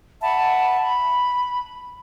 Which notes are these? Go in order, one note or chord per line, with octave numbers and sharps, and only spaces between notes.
E5 F#5 A5 B5
B5